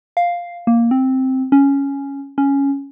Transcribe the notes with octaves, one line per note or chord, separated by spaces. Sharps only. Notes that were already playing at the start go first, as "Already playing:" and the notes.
F5
A#3
C4
C#4
C#4